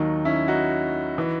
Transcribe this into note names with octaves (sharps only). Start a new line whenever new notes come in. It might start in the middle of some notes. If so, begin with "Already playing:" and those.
Already playing: D#2 D#3 F#3 D#4
C#4 E4
D#4 F#4
E3